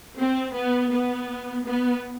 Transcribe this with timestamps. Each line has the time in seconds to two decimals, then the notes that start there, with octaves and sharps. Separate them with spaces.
0.17 C4
0.54 B3
0.90 B3
1.65 B3